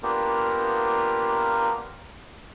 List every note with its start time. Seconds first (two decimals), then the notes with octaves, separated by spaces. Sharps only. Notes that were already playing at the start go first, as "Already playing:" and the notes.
0.03 A#3 B3 D4 F4 G4 A#4